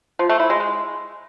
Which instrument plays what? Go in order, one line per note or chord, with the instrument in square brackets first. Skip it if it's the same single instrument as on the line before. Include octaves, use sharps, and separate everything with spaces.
[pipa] F3
A3
E4
G#3
G#3